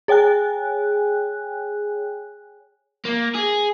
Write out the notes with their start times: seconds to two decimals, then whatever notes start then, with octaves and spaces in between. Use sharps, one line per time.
0.08 G#4 C#5 G5 G#5 F#6
3.05 A#3
3.35 G#4